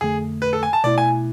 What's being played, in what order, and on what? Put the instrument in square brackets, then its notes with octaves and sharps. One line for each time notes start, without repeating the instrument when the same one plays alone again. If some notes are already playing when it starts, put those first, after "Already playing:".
[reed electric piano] F2 D3 A3 [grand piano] G#4
[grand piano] B4
A4
G#5
A5
[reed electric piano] B2 A3 E4 [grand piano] D5
[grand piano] G#5